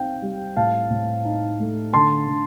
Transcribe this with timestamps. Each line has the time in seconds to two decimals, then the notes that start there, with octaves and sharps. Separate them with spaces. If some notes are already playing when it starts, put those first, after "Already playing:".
Already playing: C4 D#4 F5 G5
0.22 G3
0.57 A2 F5 A5
0.90 A2
1.25 D#4
1.60 A3
1.93 D3 A5 C6
2.28 D3